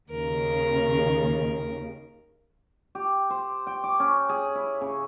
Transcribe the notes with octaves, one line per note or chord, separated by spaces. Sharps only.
D#2 C#3 A#4
G4
C5
G5
D6
C#4
G#4
E4
C#3